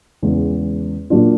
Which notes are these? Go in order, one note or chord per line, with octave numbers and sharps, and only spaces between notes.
E2 C#3 E3 G#3
A#2 F#3 A#3 D4 F4